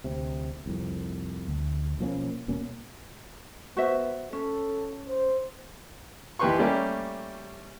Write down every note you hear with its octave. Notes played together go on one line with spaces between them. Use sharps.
D2 C3
C2 F2
D2
B1 F3 A#3 C#4
D#1 B2 A#3 C#4
B3 F#4 C5 E5
C#4 A4
C5
D#2 E3 G4 B4 C6 C#6
G3 A3 A#3 C#4 G4